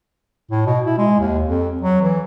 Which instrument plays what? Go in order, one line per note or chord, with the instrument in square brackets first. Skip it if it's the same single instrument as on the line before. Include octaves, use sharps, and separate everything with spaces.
[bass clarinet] A2
B2
E4
G#3
D#2
F2
F#3
E3